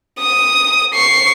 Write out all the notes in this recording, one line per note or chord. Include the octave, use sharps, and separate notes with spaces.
D#6
C#6 C7